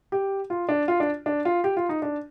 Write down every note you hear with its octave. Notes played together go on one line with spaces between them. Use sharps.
G4
F4
D4
F4
D4
D4
F4
G4
F4
D#4
D4